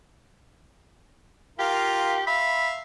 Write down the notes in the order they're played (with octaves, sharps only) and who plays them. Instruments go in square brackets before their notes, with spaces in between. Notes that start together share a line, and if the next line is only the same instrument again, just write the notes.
[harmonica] F4 A#4 F5 [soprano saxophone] G4
[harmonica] E5 F5 [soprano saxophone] B5